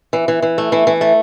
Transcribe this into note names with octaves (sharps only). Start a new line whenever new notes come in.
E3
E3
E3
A3
E3
E3
A3